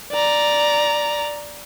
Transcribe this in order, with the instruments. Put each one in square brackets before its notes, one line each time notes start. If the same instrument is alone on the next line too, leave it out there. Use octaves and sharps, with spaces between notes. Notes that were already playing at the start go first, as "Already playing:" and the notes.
[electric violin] D5 A#5